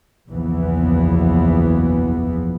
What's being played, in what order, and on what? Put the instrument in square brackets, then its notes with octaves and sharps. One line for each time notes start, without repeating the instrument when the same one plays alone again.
[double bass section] F#1 B1 E2 E3 F3 B3